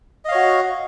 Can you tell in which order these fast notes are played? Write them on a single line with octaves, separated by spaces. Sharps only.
D#5 F5 C#5 F#4